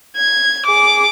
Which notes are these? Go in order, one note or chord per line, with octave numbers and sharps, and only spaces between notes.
G#6
G#4 D6